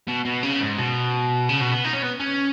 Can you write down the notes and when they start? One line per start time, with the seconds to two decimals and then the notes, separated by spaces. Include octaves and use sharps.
0.08 B2
0.25 B2
0.43 C#3
0.61 G#2
0.78 B2
1.49 C#3
1.61 B2
1.72 B3
1.84 D#4
1.93 C#4
2.02 B3
2.20 C#4